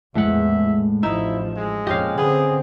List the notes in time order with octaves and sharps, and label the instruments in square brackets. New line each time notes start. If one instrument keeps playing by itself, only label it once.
[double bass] A#1 E2 [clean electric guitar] A2 G#3 F#5 [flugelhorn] E5
[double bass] A1 F3 [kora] D#4 [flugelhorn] E4 [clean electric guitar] E5
[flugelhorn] G#3
[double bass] F2 A#2 [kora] C#4 G4 [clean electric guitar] D#5 F5
[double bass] D3 C4 [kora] B3 [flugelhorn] G#4